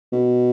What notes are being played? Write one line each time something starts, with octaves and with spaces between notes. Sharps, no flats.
B2